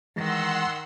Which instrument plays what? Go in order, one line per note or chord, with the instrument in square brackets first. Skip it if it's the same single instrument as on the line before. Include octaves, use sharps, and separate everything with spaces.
[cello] D#3 [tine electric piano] E3 G#3 [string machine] F#5 C6 E6